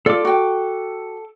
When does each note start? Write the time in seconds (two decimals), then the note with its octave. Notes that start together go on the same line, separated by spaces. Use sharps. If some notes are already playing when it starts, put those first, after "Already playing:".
0.06 F4 A4 D5 D6
0.25 F#4 G5